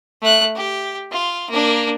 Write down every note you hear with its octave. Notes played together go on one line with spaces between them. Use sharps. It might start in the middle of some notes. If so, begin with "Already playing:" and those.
A3 F#6
G4
F4
A#3 D4